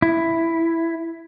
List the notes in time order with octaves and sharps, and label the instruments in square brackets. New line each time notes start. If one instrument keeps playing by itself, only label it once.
[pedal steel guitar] E4